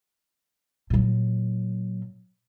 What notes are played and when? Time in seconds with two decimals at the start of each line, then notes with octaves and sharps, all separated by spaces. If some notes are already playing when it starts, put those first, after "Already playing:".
0.90 A#2 F#3